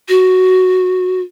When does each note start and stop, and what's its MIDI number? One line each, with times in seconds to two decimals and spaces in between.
0.09 1.21 66